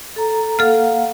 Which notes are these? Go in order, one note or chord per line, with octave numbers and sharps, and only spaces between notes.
A4 A#5
A#3 A4 F5 F#5 F6